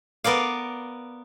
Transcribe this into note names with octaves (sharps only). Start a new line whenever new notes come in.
B3 A#4 D5 F5